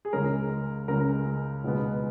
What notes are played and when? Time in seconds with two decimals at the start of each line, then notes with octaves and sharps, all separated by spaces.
0.05 G#4
0.13 C#2 C#3 G#3 C#4 A#4
0.88 C#2 C#3 G#3 C#4 A#4
1.64 C#2 B2 G#3 B3